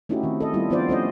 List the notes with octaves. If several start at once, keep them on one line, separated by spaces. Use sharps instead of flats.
A3 C#4 D#4 E4 F#4 G4
D#3 C4
A4 D#5
G3 B3 E4 F4
F3 B3 D4 F4 C5 D5
A3 C#4 C5 D#5